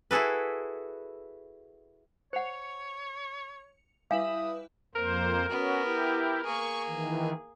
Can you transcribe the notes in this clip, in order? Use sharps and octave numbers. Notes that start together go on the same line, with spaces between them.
E4 F#4 G#4 A4 B4
C5 C#5 F#5 C#7 F7
G3 E4 B4 E5 F5 G#5 D#6
F2 A#3 A#4 C5
B3 C#4 F#4
E4 G4
A#3 G#4 C#6
D#3 E3